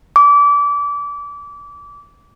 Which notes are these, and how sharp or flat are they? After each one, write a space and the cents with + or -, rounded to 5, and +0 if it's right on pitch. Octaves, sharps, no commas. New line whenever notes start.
D6 -25